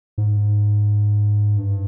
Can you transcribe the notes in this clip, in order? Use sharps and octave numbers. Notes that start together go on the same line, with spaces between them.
G#2
G2